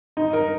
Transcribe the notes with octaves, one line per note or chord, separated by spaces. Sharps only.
D#4
A#4